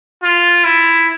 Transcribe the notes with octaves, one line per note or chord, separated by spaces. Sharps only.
F4
E4